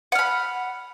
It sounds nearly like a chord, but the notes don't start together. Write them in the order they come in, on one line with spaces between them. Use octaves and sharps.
F#5 F6 B5